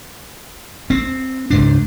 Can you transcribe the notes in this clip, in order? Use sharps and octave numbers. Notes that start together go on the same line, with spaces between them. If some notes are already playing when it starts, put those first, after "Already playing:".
C4
C#2 G#2 D4